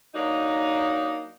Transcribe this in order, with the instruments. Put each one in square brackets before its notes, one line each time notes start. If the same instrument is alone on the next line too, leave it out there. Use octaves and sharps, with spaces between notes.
[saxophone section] F#3 A#3 D4 D#4